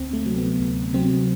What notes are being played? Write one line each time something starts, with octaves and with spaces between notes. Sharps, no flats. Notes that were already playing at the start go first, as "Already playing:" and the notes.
Already playing: D2 C4
A3
C3 F#3
B3
D2
C3 F#3 C4